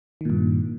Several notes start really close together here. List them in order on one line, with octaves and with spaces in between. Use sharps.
D#3 A#2 G2